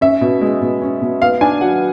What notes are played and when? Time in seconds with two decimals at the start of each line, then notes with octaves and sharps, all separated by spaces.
0.01 C#4 E5
0.21 B2
0.41 G#3
0.62 B2
0.82 C#4
1.02 B2
1.21 B3 F5
1.41 D4 G#5
1.61 F#3 F#5